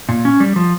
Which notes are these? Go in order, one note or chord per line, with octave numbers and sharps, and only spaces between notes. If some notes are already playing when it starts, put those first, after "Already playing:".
A#2
C#4
G3
F3